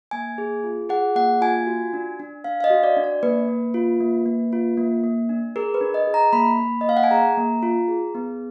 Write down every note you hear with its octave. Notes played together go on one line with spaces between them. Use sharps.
A#3 G#5
G#4
F4
G#4 F#5
A#3 F#5
F4 G#5
F#4
D4
D4
D4 F5
F5
D#5
F#4
D5
D4
D5
A#3 B4
A#3
F4
A#3
A#3
F4
A#3
A#3
D4
G#4 A#4
B4
D4
D#5
G#4
A#5
A#3 B5
A#3
D#5
A#3 F5
F#5
G#5
G#4 A#5
A#3
F4
G#4
B3